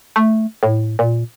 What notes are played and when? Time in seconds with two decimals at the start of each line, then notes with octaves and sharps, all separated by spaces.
0.16 A3
0.63 A2
0.99 A#2